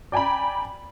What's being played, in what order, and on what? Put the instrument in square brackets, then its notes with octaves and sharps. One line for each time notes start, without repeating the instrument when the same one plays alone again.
[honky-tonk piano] D5 G5 G#5 A#5 B5